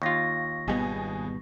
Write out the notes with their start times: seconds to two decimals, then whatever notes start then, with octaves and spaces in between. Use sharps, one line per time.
0.02 D#2 F4 C#6 A#6
0.68 G#1 B2 G3 B3 G#4 D#5